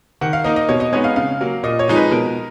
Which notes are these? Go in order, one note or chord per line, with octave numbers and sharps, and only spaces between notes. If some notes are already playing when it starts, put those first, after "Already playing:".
D#3 F#5
F5
A#3 D#4 D#5
D#5
B2 C#5
D#5
G#3 B3 D#4 C#5
F5
C#3 F5
F#3 A#3
A#2 D#5
C#5
F3 G#3 D#4
B4
B2 A#4